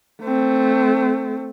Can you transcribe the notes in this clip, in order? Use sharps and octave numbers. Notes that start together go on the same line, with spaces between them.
A3 C4